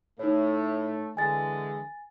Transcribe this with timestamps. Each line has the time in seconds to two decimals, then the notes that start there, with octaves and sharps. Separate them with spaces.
0.19 A2 A3 D#4 C#5
1.17 D3 E3 G#3 G#5 A6